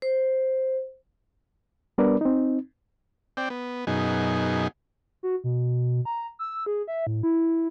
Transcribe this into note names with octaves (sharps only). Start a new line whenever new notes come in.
C5
G3 B3 D4 A#4 B4 D5
C4 D#4
C4 D5 G5
B3
F#2 B2 D#4 G#4
F#4
B2
A#5
E6
G#4
E5
A2
E4